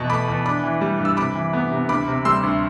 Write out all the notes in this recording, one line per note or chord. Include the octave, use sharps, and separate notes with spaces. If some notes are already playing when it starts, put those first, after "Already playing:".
Already playing: E2 B2 A5
A3 B5 D6
E2
D4 B5 D6
E3
G3
G2
E6
C3 B5 D6
E3
B3
C3
D2 B5 D6
C3
G3 C6 E6
D2